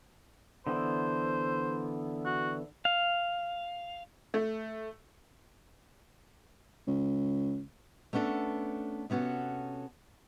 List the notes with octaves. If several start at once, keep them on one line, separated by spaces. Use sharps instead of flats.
D3 E3 B3 C5
F#4
F5
A3
C#2
A3 B3 C#4 D4 A4
C3 B3 C#4 F#4 A4